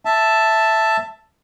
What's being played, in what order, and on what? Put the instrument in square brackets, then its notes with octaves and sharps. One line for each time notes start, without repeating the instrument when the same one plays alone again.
[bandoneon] E5 A5